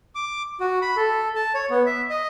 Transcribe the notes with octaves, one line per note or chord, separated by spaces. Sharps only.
D6
F#4
B5
A4
A5
C#5
B3
E5
D#5